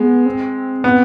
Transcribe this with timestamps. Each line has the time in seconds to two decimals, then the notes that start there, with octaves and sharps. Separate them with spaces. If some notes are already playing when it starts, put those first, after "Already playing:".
Already playing: G#3 B3
0.26 C4
0.84 B3